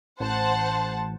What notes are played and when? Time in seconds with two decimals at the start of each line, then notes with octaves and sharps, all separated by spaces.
0.20 A1 C5 F#5 A5